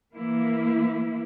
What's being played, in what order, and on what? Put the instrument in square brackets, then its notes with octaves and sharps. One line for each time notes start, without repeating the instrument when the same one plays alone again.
[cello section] E3 A#3 E4